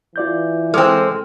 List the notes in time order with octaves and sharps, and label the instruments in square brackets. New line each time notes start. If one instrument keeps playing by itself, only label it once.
[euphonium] E3 [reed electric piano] F4 D5 G6
[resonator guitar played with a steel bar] G#3 C4 [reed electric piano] A4 D6 F6